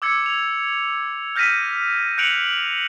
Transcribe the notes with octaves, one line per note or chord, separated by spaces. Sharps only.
D6 E6 G#6 C#7
F7
F6 G6 A#6 B6 D#7
F#6 G6 C#7 D7 F7 F#7